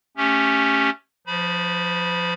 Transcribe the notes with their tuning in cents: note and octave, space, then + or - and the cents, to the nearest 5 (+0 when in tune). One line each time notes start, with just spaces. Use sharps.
A3 +0 C#4 +0 G4 +5
F3 +15 C5 -45 B5 -25